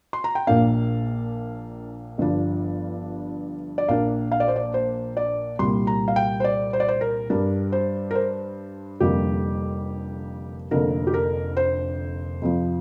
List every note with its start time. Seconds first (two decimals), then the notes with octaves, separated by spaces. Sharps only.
0.13 C6
0.24 A#5
0.35 G5
0.47 A#1 A#2 A#3 D4 F5
2.18 G1 G2 F3 D4
3.78 D5
3.89 A#1 A#2 A#3 D4 F5
4.32 F5
4.40 D5
4.48 C5
4.56 D5
4.74 C5
5.17 D5
5.59 C2 A#2 G3 C6
5.87 A#5
6.08 F5
6.16 G5
6.40 C5
6.44 D5
6.73 C5
6.80 D5
6.88 C5
7.01 A#4
7.30 G2 G3 D4 A#4
7.72 C5
8.11 A#4
8.15 C5
9.00 F1 F2 D3 G3 A#3 G4
10.71 F1 F2 D3 A#3 A#4
11.07 G4
11.14 A#4
11.57 C5
12.42 F2 C3 F3